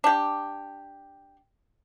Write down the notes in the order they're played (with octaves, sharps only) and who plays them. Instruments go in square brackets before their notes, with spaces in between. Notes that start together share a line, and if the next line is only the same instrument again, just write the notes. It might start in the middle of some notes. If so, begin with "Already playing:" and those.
[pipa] D4 G4